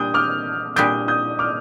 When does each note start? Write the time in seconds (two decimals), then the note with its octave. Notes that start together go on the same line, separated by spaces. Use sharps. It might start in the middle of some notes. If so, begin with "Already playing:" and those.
Already playing: A#2 G3 D4 D#6 G6
0.14 D6 F6
0.76 A#2 G3 D4 D#6 G6
1.08 D#6 G6
1.39 D6 F6